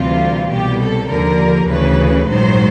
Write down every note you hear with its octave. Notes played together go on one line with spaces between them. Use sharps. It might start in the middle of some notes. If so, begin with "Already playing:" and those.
Already playing: D2 C3 E3 G3 F4
C2 B2 G3 G4
A4
D#2 D3 F3 A#4
D2 C#3 E3 G3 B4
A#1 G#2 D#3 F#3 C5